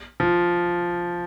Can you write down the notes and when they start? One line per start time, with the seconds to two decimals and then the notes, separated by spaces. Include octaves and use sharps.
0.20 F3